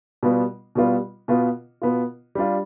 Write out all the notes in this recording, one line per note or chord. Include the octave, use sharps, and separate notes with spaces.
B2 G3 B3 F4
B2 G3 B3 F4
B2 B3 F4
B2 B3 F4
G3 D4 F4